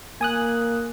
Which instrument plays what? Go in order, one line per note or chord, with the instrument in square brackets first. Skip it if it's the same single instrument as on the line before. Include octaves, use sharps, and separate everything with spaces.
[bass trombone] A#3 [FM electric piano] G#5 D#6 F#6